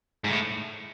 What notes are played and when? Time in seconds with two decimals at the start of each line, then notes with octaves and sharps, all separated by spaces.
0.24 G#2
0.28 A2